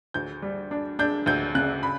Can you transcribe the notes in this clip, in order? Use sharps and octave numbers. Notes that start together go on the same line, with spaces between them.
D2 G6
G3
D4
D4 G6
D2 G6
C#3 F#6
B5